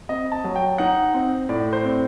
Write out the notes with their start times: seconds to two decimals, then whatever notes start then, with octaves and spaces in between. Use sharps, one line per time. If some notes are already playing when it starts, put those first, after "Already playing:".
0.09 C4 D#5
0.32 A5
0.44 F#3
0.56 G5
0.78 D#4 F#5
1.14 C4
1.49 A2 D5
1.73 C5
1.84 C4